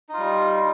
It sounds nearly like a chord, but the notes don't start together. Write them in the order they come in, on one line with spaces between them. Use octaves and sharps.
D#4 F4 G3